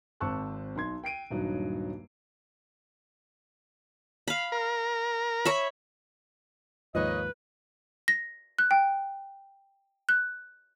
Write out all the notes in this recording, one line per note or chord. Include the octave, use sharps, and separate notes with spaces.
G#1 C4 A5 C#6 E6 F#6
B1 D#4 C6 G#6
G5 C7 D7 D#7
D#1 G2 F#3 D#4
F5 B5
A#4
C#5 E5 B5
D#2 G#2 F3 A#3 B4 C#5 D#5
A#6
F#6
G5
F#6